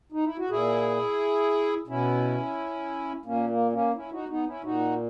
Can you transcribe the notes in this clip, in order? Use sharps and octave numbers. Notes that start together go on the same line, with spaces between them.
D#4
E4
F#4
A#2 E4 G#4
B2 C#4 E4
A#2 A#3 C#4
A#3
A#3 C#4
C#4 E4
D#4 F#4
B3 D#4
C#4 E4
A#2 D#4 F#4